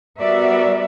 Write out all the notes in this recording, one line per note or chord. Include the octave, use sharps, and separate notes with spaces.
G3 B3 F#4 A#4 D5 E5